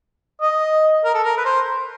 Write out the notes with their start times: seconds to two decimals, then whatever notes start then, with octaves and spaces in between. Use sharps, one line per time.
0.42 D#5
1.04 A#4
1.14 A4
1.24 A#4
1.37 B4
1.45 C5